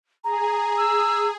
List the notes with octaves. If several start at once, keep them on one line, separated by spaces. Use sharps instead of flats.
G#4 A#5
E6